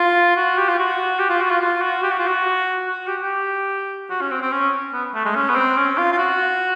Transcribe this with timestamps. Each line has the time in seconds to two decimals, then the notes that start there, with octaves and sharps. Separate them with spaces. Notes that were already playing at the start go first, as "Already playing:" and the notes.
Already playing: F4
0.36 F#4
0.57 G4
0.68 F4
0.78 F#4
1.19 G4
1.30 F4
1.41 F#4
1.50 F4
1.61 F4
1.81 F#4
2.03 G4
2.10 F#4
2.19 F4
2.27 F#4
2.86 F#4
3.07 G4
3.22 G4
4.10 F#4
4.21 C#4
4.31 C4
4.41 C4
4.52 C#4
4.93 B3
5.15 A3
5.25 G#3
5.35 C#4
5.49 B3
5.55 C4
5.77 C#4
5.98 F4
6.12 F4
6.18 F#4